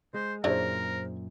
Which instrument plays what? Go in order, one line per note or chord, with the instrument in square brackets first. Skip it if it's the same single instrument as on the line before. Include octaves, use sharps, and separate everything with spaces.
[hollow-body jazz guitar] G#3 [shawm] C5
[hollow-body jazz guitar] F#2 A#2 [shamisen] D4 E4 C#5 [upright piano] G#4 C5 [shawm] A#4